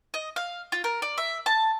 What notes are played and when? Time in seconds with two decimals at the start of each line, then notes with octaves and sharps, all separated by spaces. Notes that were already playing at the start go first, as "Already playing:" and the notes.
0.14 D#5
0.36 F5
0.72 F4
0.84 A#4
1.02 D5
1.18 E5
1.46 A5